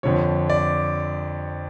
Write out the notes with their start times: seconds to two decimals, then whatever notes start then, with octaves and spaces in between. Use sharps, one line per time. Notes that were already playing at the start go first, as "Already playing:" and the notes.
0.03 F2 D3 F3 C#5
0.50 D5